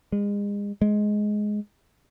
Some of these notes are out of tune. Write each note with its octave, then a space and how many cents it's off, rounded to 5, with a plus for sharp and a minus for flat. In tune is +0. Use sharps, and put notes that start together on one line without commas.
G#3 -35
G#3 +10